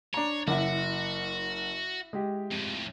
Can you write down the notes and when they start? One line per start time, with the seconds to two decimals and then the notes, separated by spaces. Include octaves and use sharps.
0.14 D4 C#5 A#5
0.48 F#1 E4 F#4 F#5 D6
2.13 G#3 G4
2.51 F2 A2